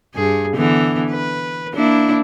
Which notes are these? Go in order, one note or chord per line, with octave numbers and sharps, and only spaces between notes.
G2 G#4
D3 E3 B3
B4
A#3 D4 E4